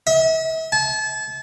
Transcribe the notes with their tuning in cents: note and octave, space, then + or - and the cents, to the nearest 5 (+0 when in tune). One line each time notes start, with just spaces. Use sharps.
E5 -40
A5 -35